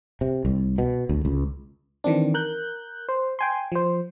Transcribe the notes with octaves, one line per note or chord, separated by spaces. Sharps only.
C3
C2
B2
D2
C#2
D#3 E3 C4 D4
A#4 F#6 G6
C5
G5 G#5 C6
F3 C5